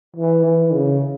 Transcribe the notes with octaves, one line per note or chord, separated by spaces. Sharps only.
E3
E3
C#3